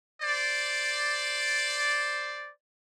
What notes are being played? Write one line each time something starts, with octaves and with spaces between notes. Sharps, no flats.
C5 D5